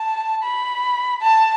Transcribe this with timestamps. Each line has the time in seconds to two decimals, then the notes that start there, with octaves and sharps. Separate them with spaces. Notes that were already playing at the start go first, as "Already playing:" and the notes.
Already playing: A5
0.43 B5
1.21 A5